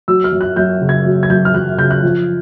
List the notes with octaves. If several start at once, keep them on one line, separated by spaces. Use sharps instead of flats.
F#3 E6
F6
F#2
F#6
F#2 G6
C#3
G#6
F#3
G#6
F#2 G6
F6
F#2 F#6
C#3 G6
F#6
F3